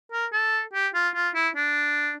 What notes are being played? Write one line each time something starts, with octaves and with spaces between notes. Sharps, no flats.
A#4
A4
G4
F4
F4
E4
D4